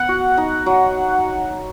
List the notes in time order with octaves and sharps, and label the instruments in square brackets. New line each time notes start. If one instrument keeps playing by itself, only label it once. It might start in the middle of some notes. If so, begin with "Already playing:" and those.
Already playing: [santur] B3 [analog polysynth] F#5
[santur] F#4
D#4
F#3